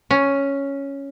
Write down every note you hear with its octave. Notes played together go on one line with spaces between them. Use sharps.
C#4